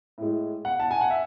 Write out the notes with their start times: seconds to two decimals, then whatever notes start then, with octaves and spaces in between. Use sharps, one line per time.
0.18 A2 G#3
0.65 F#5
0.80 A5
0.91 G#5
1.01 F#5
1.11 E5